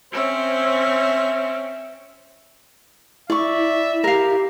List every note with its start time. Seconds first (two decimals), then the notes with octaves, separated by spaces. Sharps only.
0.12 C4 C#4 C5 E5
3.30 E4 D5 E5 C#6
4.04 G4 A#4 F5